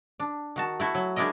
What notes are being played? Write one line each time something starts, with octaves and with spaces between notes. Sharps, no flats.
D4
D#3 F#4 A5
A3 E4 F#4
F#3
G#3 A3 D4 E4 A#4 D#5